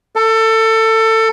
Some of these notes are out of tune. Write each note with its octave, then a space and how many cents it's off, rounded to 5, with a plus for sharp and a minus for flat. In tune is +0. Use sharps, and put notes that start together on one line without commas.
A4 +25